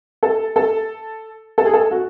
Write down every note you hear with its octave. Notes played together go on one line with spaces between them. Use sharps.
A4
A4
A4
G#4
A4
F#4